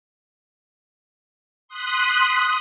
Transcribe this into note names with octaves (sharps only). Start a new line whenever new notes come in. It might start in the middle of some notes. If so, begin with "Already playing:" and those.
C6 D#6 F#6 B6 C7